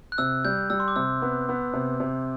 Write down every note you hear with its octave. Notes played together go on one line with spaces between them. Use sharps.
F#6
C3 E6
G3 G6
G3 E6
C6
D6
C3 E6
B3
B3
C3
C3